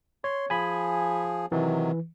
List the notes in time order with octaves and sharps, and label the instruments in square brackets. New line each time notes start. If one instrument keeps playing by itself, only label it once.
[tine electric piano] C#5 [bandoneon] C6
[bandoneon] F3 G#4 [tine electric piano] G#5 B5
[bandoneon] C3 D#3 F#3 [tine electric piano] E3